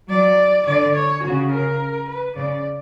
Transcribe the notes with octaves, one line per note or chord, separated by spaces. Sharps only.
F#3 D5
D3 D5
C#5
C#3 F#4
A#4
B4
C#3 D5